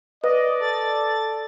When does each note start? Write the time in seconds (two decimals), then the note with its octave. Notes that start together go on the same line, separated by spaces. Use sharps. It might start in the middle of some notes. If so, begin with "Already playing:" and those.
0.24 B4 D5 D#5
0.61 A4 A6